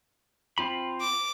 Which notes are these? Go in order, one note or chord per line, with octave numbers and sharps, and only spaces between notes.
C4 F4 B5
D6